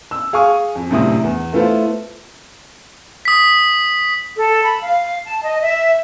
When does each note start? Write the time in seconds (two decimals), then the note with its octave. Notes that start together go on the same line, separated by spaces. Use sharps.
0.11 E6
0.33 G#4 F5 G#5 C#6 D#6
0.75 F2
0.90 A#1 F#2 A2 C3 E4 D#6
1.24 E2
1.53 A3 B3 E4 F4 A4 C5
3.25 D#6 B6
4.35 A4
4.64 B5
4.83 F5
5.24 A5
5.42 D#5
5.62 E5